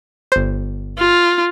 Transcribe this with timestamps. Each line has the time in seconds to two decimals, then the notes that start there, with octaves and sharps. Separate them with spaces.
0.32 G1 C5
0.98 F4